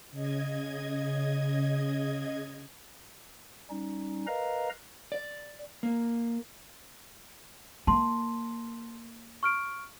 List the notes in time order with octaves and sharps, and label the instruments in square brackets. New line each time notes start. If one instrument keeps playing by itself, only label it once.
[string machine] C#3 D#5 G#6
[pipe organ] G3 C#4 D#4
A#4 B4 D#5 F5 A#5
[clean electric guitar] D5
A#3
[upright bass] A#3 [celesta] A5 C6
[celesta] C#6 F6 D7